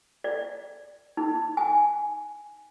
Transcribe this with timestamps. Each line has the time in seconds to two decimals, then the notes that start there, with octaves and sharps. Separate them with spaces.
0.24 D5
1.17 D#4
1.57 G#5